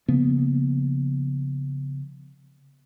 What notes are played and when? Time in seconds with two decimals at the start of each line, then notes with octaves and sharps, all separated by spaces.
0.08 C#3 F3 A#3 B3